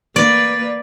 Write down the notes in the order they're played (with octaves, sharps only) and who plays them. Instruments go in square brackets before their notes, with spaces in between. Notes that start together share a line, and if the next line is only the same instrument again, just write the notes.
[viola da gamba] A#3 B4 [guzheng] D5